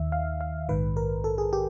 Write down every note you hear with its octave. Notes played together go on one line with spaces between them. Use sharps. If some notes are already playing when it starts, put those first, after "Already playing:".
Already playing: D#2 D#3 E5
F5
F5
A#1 G#2 D#3 B4
A#4
A4
G#4
G4